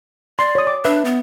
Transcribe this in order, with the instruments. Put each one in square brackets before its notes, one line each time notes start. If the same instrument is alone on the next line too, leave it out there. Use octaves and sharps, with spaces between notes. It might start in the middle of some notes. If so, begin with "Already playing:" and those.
[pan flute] D5 [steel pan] C6
[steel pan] C#5 D#6
D6
[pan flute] D4 [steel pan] B4 E5
[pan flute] B3